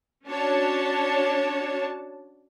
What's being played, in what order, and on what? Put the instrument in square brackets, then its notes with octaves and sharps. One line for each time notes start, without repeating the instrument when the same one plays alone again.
[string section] C#4 D4 F#4 C#5 A5